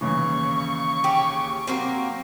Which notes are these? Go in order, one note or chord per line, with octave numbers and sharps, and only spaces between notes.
D#2 C#3 E3 C#6
G4 G#4
F#3 A#3 C4